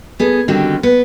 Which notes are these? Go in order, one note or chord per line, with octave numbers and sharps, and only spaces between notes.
B3 G#4 A4
D3 D#3 G3 C4 F#4 G4
B3